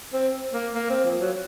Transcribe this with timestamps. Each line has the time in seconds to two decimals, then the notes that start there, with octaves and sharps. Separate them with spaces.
0.13 C4
0.53 A#3
0.75 A#3
0.90 C4
1.05 F3
1.20 F#3